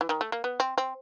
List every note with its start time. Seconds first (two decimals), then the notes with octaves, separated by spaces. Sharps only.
0.01 E3
0.09 D#3
0.21 A3
0.32 A#3
0.44 B3
0.60 C4
0.78 C4